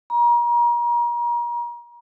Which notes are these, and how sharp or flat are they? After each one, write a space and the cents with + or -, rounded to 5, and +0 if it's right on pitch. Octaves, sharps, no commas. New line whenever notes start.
A#5 +35